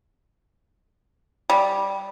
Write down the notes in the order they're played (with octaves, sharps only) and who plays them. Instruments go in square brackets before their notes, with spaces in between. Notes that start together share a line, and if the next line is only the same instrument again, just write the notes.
[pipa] G3